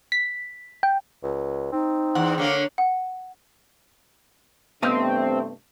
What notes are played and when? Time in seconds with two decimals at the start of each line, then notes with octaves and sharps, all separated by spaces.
0.12 B6
0.83 G5
1.23 C#2
1.72 C4 D#4
2.15 E2 F#5
2.38 D3 A#3 C#5
2.78 F#5
4.82 G2 C3 A3 B3 C4 D#5 F5